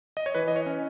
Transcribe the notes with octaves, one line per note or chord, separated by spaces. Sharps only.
D#5
C#5
E3 B4
D#5
C#5
C#4